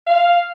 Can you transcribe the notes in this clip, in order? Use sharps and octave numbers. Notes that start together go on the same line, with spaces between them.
F5